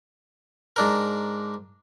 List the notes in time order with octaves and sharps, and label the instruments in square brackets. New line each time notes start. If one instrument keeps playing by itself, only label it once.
[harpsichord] G#2 D4 A#4